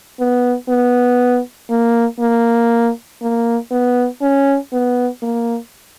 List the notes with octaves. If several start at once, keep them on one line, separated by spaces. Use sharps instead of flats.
B3
B3
A#3
A#3
A#3
B3
C#4
B3
A#3